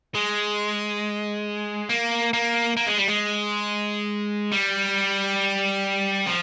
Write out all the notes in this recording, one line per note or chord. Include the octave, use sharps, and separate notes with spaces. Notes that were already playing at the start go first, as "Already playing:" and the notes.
G#3
A#3
A#3
A#3
G#3
G3
G#3
G3
F3